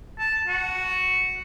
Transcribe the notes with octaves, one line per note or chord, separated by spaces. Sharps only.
A5
F#4